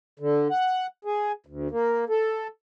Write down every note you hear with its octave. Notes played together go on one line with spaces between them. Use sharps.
D3
F#5
G#4
D2
A#3
A4